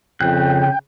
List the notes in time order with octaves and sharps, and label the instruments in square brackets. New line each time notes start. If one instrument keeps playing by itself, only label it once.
[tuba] F2 [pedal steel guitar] C#3 F#6 [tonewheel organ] G5